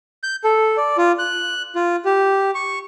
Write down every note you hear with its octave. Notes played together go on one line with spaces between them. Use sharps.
G6
A4
D5
F4
F#6
F4
G4
C#6